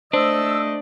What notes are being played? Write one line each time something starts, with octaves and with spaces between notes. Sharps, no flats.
A3 D4 C5 D#5 E6